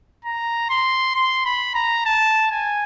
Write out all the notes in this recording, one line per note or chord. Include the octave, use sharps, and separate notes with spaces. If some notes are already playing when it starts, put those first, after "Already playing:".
A#5
C6
C6
B5
A#5
A5
G#5